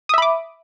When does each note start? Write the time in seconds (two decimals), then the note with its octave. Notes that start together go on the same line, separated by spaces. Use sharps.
0.09 D#6
0.14 E5
0.18 B5
0.22 D6